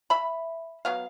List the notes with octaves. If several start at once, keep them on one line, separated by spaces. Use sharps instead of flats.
E5 B5
F#3 B3 F5